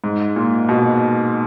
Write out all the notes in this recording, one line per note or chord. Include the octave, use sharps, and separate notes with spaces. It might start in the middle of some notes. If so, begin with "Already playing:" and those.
G#2
A#2
B2